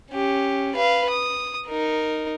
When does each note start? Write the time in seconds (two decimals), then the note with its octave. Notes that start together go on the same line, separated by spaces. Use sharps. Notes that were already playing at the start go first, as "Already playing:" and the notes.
0.11 C#4 G4
0.75 B4 F5
1.09 D#6
1.67 D#4 A#4